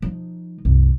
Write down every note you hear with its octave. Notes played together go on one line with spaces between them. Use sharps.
F3 D#4
C2 F#2